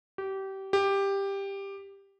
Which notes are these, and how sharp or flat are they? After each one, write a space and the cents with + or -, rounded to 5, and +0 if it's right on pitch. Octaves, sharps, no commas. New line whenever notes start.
G4 -25
G4 +10